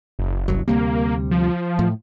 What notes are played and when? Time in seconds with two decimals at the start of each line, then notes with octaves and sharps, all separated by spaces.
0.19 F#1
0.48 C2 G2 F#3
0.68 D2 C3 G3 A#3
1.31 F3
1.79 A2